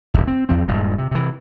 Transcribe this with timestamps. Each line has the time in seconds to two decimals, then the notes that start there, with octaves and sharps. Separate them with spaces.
0.14 D1 D#2
0.27 C4
0.49 E2 F3 C4
0.68 D#1 G2 A#2 G#3
0.98 C3
1.11 C3 E3